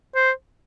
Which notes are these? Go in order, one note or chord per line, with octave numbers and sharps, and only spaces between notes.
C5